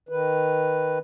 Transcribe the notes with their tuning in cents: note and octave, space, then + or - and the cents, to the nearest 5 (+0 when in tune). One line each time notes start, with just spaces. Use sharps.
D#3 +0 B4 +0